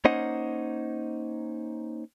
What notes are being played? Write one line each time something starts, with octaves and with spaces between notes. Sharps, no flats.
A#3 C#4 D#4 C5 D#5 F#5